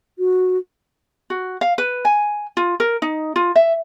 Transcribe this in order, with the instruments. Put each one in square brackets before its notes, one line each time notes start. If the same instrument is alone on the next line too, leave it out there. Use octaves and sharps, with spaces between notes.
[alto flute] F#4
[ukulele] F#4
F5
B4
G#5
F4
A#4
D#4
F4
E5